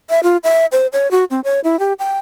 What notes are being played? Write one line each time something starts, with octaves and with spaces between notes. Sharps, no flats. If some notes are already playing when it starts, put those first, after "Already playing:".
E5
F4
E5
C5
C#5
F#4
C4
C#5
E4
G4
G5